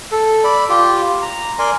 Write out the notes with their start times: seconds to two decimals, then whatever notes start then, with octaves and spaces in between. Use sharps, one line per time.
0.12 A4
0.44 D5 B5
0.69 F4 G4
1.22 A#5
1.59 A#4 D5 G#5 C6